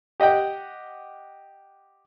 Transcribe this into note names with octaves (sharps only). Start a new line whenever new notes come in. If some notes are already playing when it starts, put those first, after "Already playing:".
G4 D#5 F#5 G5